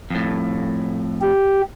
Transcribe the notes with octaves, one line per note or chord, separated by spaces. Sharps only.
F2 A2
G4